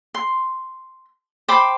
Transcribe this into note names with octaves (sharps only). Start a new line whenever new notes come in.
C6
C5 G5 B5 D6